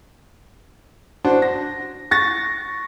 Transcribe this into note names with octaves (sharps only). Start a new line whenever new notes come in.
D4 F#4 C5
A#6
C#6 A6 A#6